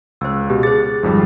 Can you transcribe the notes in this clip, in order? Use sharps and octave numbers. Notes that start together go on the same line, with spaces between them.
C#2 C5 E6
B2 G4
G#4 B4 C5 A6
G#1 F2 G3